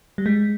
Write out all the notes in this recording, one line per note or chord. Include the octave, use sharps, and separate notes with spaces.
G3
G#3